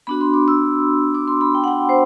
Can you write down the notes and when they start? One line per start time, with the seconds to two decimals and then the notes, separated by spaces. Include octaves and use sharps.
0.07 B3 D4 F#4 B5
0.21 C6
0.34 D6
0.48 E6
1.14 D6
1.28 C6
1.41 B5
1.55 G5
1.64 F#5
1.68 G5
1.89 C5